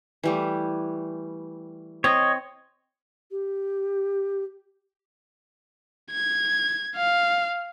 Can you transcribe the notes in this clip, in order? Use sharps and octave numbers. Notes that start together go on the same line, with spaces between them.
E3 G3 A3
C4 C#5 D#5
G4
G#6
F5